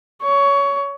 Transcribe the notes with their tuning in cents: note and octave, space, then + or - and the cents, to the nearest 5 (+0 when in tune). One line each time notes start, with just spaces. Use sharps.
C#5 +20